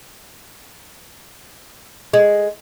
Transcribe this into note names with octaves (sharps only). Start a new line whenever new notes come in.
G#3